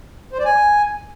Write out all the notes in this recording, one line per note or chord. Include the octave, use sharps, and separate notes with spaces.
C5
D5
G#5